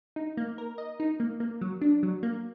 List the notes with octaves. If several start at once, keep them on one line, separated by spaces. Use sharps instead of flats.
D#4
A#3
A#4
D#5
D#4
A#3
A#3
F#3
D4
F#3
A#3